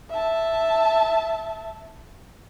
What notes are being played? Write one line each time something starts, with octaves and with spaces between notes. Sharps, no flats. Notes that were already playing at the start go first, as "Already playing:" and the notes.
E5 A5